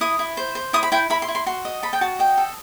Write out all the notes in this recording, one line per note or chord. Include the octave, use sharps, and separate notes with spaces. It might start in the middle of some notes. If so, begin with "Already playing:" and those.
E4 D#6
E4
C5
C5
E4 D#6
B5
E4 G5
E4 B5
C6
E4
C6
F#4 C6
D#5
A4 B5
G5
F#4 A5
D#5 G5
A4